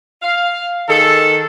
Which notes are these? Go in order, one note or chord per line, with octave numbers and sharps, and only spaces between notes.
F5
D#3 G#4 A4